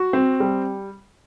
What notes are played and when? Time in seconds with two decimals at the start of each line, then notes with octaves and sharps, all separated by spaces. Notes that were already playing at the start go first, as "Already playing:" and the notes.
Already playing: F#4
0.13 C4
0.40 G3